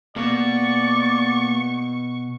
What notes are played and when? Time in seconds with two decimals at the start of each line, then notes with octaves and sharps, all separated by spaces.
0.16 B2 A#3 D5 C#6